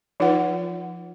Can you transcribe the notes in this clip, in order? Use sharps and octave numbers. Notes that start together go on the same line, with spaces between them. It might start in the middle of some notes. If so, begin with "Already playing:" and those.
F3 D#4 F4 B4 F#5